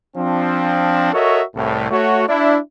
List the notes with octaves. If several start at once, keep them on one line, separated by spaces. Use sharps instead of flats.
F3 C4 D4
F#4 A4 A#4 C#5 D#5 E5
C2 A2
A3 F#4 C#5
D4 E4